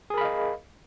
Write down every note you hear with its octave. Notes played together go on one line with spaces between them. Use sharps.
G#4 A#4 D#5 F5 B5